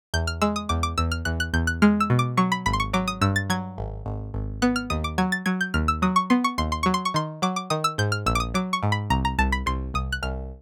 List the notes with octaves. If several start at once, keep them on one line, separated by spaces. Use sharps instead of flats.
E2 G6
F6
G#3 E6
D#6
E2 D6
D6
E2 E6
F6
E2 F#6
F#6
E2 G6
F#6
G#3 F6
E6
B2
D6
F#3 C#6
B5
G#1 B5
C6
C#6
F#3 D6
D#6
G2 E6
A6
F#3 G#6
G#1
G#1
G#1
B3 F#6
F6
D#2 D#6
D6
F#3 G#6
A6
F#3 G#6
G6
D#2 F6
E6
F#3 D#6
C#6
B3 C6
C#6
D#2 C6
C6
F#3 C#6
C6
C#6
D#3 C6
F#3 D6
D6
D#3 D#6
E6
G#2 G6
F6
A#1 E6
D6
D#6
F#3 D6
C#6
G#2
B5
C2 A#5
A#5
C2 A5
B5
C2 C6
C2 D#6
F#6
C2 F6